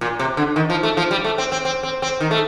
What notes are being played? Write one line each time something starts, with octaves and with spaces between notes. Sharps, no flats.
A#2
C3
D3
D#3
F3
A3
F3
G3
A3
C4
C4
C4
C4
C4
D#3
A3